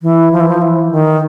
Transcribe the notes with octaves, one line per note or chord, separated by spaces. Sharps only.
E3
F3
E3
F3
E3
D#3